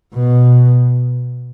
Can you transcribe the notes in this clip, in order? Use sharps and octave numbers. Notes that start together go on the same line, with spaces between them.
B2